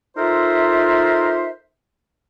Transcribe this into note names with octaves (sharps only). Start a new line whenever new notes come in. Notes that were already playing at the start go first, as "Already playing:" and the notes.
D#4 F4 A4 A#4 C5 E5